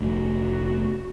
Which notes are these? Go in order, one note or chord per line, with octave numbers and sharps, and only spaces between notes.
F1 D2 F#4